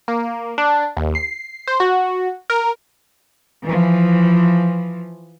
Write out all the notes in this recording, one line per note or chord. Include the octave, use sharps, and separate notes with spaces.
A#3
D4
D#2
C7
C5
F#4
A#4
E3 F3